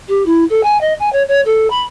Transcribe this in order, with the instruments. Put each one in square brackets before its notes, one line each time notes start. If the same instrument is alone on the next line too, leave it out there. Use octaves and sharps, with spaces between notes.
[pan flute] G4
E4
A4
G#5
D#5
G#5
C#5
C#5
A4
B5